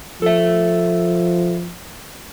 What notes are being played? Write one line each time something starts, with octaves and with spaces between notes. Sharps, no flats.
F3 A4 E5